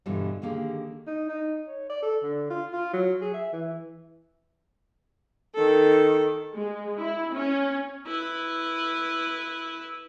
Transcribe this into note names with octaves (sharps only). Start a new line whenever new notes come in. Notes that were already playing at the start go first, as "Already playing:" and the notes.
G2 B2 D3 E3 F3 G3
D3 D#3 A#3 G4 G#4
D#4
D#4
C#5
D5
A4
D3
F4
F4
F#3
G#4
E5
E3
D#3 A4
G#3
E4
C#4
E4 B4